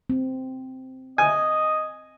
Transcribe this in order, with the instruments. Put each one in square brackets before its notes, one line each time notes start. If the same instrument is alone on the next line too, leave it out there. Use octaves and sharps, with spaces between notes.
[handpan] C4
[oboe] D#5 [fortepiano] G#5